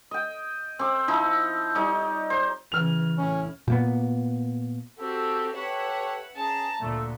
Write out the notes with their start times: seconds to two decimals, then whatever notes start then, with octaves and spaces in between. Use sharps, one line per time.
0.11 D#5 G5
0.79 C4 D6
1.08 F3 D#4 E4
1.75 G3 D#4 C#5
2.30 C5
2.72 C#3 E3 F6 F7
3.18 A2 C#4 E4
3.68 A#2 A#3 B3
4.99 C4 F#4 G4 A4
5.54 G4 A4 B4 C#5 E5 F#5
6.36 C#4 G#4 A5 A#5
6.80 D2 A#2 A3